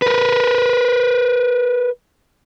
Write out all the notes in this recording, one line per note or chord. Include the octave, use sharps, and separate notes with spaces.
A#4 B4